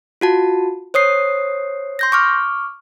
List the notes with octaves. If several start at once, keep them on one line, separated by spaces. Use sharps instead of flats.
F4 F#4 A5
C5 C#5 D#6 C7
C6 G6 A#6
C#6 D6 F6